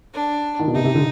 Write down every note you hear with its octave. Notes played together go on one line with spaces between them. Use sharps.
D4
D#3
B2
C3 D#4
C3
D3